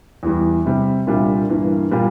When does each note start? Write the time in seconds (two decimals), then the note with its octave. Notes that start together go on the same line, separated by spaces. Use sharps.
0.23 E2 E3 G3
0.65 C3 G3 C4
1.07 C2 A#2 G3 D4 F4
1.49 G2 E3 A#3
1.91 A#2 G3 A#3 F4